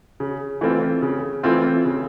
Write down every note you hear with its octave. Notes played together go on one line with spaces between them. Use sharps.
C#3
E3 A3 C4 F4
C#3
E3 A3 C4 F4
C#3